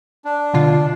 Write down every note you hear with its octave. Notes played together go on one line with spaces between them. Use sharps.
D4
B2 D3 F4